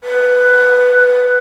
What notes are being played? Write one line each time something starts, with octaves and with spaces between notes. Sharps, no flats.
B4